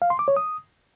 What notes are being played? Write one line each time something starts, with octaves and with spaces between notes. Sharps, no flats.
F5
C6
D6
C#5
D#6